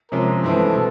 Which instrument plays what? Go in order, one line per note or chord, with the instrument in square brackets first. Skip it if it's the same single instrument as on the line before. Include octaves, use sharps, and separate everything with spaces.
[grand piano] C3 F3 G#3 C#4 [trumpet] A#4
[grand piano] G2 E3 G#3 C4 E4 [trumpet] A4
[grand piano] B2